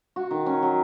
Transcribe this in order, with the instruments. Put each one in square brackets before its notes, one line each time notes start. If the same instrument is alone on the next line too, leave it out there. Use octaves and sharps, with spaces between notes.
[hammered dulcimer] F#4
D#3
C#4
F#3